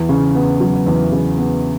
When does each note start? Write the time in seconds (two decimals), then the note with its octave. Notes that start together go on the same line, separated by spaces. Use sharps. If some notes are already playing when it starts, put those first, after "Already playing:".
Already playing: E2
0.09 C#3
0.35 B3
0.60 F#3
0.86 E2
1.12 C#3
1.38 B3